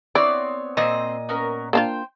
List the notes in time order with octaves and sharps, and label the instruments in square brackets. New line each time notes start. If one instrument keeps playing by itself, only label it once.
[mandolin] B3 C4 C#5 [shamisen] E4 [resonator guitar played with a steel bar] D5
[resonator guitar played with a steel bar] A#2 D#5 [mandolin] C4 C5
[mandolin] B3 C#4 A#4
[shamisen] A#3 D4 F4 [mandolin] C5 G5